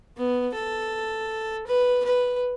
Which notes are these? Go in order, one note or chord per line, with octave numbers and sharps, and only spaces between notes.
B3
A4
B4
B4